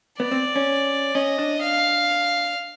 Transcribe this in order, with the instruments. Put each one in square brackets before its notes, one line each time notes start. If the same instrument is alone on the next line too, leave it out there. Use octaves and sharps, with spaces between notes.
[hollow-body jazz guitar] B3 [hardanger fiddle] D5
[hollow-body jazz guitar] C4
C#4
[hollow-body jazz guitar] C#4 [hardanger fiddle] D#5
[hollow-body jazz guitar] D4
[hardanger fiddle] F5